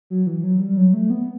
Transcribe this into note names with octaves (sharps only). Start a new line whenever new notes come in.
F#3
E3
F#3
G3
F#3
A3
B3